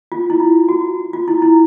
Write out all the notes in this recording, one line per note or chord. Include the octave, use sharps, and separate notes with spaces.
F4
E4
F4
F#4
F4
E4
E4